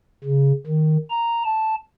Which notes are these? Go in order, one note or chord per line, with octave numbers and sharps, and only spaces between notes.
C#3
D#3
A#5
A5